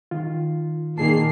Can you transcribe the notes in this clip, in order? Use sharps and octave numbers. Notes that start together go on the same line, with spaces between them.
D#3 F4
A#2 D#3 A#3 G#4 A5 C7